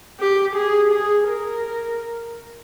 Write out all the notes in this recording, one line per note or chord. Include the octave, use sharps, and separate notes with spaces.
G4
G#4
G#4
A#4